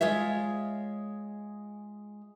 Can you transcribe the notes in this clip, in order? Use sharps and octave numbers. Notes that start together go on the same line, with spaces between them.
G#3 F4 C#5 E5